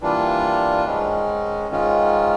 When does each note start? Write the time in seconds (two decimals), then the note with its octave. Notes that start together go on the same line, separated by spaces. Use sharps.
0.01 E3 G3 A#3 D4 F4
0.85 G#2 D#3 G#3 C#4
1.69 G#2 D#3 G#3 C#4 F4